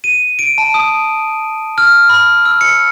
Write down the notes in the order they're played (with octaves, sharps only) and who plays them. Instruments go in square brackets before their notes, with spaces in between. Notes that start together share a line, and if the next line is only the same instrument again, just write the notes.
[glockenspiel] D#7
D7
A5
D#6
F6
B5
E6
C#7